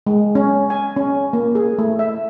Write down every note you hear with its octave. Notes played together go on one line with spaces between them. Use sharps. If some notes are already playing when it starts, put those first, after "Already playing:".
G#3
C#4
G#5
C#4
A#3
G#4
A3
E5